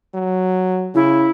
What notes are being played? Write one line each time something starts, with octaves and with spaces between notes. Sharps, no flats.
F#3
C#3 E4